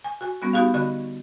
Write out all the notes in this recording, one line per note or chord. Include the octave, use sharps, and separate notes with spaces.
G#5
F#4 G#5
G3 B3 C#4 F#4
B3 D#4 F#4 G4 F5
D3 F#4 D#5 B5